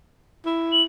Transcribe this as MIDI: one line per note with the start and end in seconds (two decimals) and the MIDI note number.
0.46 0.85 64
0.72 0.82 102